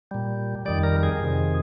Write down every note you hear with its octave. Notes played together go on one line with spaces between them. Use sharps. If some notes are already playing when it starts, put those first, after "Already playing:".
A#2 G3
F2 D#3 G3 D5
A#4
G#4
F2 C3 D#3